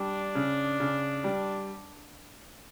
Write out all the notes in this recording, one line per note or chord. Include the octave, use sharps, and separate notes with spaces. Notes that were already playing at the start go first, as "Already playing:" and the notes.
Already playing: G3 D4
C#3
C#3
G3